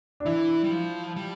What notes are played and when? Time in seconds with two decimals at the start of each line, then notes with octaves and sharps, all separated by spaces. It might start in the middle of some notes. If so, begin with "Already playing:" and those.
0.20 D4
0.25 E3 E4
0.64 G3
0.71 F3
1.16 G3